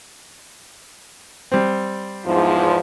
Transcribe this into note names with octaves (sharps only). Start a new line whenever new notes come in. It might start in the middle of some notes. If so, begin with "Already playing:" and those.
G3 C4
E2 G#2 F3